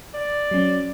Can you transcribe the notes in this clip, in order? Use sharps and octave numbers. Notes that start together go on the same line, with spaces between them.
D5
F#3 C#4